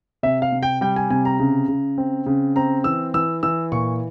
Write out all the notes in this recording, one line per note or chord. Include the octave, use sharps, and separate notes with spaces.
C3 E5
F5
C3
G5
G3 G5
G#5
C3 G#5
A#5
C#3
C#3
C4
C#3
C4 A#5
E3 E6
E3 E6
E3 E6
A#2 C#6